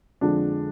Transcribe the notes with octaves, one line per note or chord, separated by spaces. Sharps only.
F2 D3 F3 G#3 D4